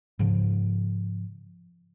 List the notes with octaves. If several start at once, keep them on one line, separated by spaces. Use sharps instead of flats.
G#2 C#3 F3